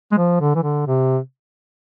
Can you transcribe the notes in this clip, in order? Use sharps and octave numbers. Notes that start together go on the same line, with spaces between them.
G#3
F3
D3
E3
D3
C3